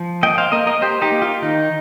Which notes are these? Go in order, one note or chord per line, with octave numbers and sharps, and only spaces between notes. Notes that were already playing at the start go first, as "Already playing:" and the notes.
Already playing: F3
A#3 D#5 G5
C5 F5
A#3 A#4 D#5
A#4 D#5
A#3 G4 C5
D#4 G4
A#3
F4
D#3 D#4